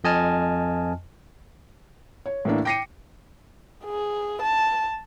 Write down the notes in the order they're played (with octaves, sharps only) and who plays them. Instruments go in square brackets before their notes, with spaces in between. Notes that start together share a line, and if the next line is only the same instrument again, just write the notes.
[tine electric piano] F2 D#5 G#5 A5 F6
[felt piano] C#5
A2 E3 A#3 D4
G5 D6 A#6 C7 C#7 D#7
[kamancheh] G#4
A5